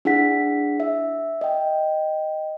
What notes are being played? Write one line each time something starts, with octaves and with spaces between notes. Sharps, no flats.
D4 E4 G#4 F#5 B6
E5
D#5 G5